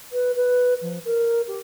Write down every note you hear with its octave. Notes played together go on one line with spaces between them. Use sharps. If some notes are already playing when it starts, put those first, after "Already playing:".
B4
B4
F3
A#4
G4